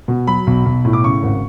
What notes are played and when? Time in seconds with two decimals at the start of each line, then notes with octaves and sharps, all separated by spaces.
0.08 B2
0.27 F#3 B5
0.47 B1
0.66 B1
0.85 A2
0.93 D6
1.04 C#3 C#6
1.23 G#1